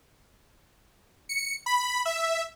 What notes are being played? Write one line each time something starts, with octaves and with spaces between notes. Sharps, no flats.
C#7
B5
E5